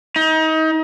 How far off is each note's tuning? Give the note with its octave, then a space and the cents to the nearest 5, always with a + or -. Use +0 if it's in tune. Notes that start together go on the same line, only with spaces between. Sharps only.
D#4 +30